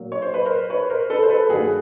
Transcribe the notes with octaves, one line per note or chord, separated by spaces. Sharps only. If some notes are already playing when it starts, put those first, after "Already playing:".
Already playing: A#2 F#3 A#3
C#5
C5
B4
A#4 C5
B4 C#5
A#4 C5
A4 B4
C5
A4 B4
G2 D#3 F#3 A#3 F#4 G#4